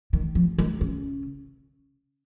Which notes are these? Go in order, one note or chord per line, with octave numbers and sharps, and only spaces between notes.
D#3
F3
D#3
C#3